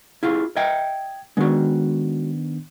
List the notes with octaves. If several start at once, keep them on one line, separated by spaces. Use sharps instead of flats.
E4 F4 G#4
D#5 E5 G5 G#6
D#3 G#3 B3 D4 F#4